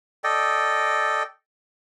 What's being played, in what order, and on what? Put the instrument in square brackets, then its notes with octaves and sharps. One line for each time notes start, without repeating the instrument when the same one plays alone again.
[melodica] A4 D5 D#5 G5